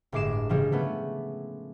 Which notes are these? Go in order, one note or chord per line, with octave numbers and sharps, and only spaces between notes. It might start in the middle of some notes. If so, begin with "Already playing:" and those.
G1 A2 G#3 D6 C7 E7
C#3 F3 G3 G#3
F3 A3 B3 C#4